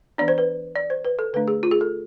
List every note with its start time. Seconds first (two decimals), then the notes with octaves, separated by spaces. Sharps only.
0.18 E3 B3 D4 D5
0.28 C5
0.38 B4
0.76 D5
0.90 C5
1.05 B4
1.19 A4
1.33 D3 A3 D4 B4
1.48 G#4
1.63 F4
1.71 G#4
1.81 A4